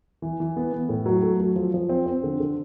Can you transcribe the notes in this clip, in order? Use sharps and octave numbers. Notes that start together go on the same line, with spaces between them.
E3
E3
B3
B3
A2
F#3
A3
F#3
F3
F3
C4
C4
D3
D3